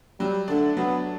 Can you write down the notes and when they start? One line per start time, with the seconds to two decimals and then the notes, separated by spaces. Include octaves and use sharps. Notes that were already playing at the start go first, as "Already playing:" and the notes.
0.20 F#3 G3
0.48 D3 A3 D4
0.76 F#3 B3